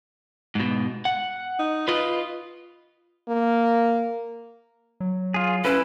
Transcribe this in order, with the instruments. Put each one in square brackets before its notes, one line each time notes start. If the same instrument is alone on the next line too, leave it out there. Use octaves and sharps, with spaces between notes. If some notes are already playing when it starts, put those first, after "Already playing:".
[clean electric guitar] G#2 B2
F#5
[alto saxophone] D#4
[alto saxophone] F4 [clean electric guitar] B4 D#5
[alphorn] A#3
[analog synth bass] F#3
[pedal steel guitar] F4 G#4
[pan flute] C#4 [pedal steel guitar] E4 [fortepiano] B4